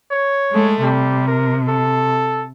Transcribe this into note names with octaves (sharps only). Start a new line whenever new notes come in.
C#5
G#3 A3
C3 G3
A#4
A4